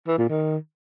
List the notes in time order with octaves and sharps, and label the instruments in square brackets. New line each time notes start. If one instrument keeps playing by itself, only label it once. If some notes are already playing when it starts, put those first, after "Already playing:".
[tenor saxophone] E3
A#2
D#3